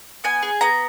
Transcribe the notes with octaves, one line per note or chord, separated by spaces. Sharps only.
B3 G#5
G#4
B3 A#5